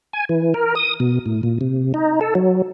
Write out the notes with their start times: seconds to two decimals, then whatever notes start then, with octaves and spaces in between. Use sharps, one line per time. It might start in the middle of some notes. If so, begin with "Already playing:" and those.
0.13 G#5
0.29 E3
0.54 A#4
0.75 D#6
1.00 B2
1.26 A2
1.43 A#2
1.61 C3
1.94 D#4
2.21 A4
2.35 F#3